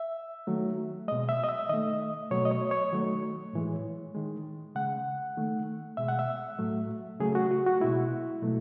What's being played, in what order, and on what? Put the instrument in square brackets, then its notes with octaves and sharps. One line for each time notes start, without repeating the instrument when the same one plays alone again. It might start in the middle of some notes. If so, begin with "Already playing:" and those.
Already playing: [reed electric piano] E5
D#3 F#3 A3
B2 G#3 D#5
E5
D#5
E5
D#3 A3 D#5
B2 F#3 A3 C#5
D#5
C#5
C#5
D#3 F#3 A3
A2 E3 G#3
D#3 G#3
C#3 G#3 F#5
D#3 A3
B2 G#3 E5
F#5
E5
A2 F#3 A3
C#3 F#3 A3 G#4
F#4
F#4
F#4
B2 G#3 E4
B2 F#3 A3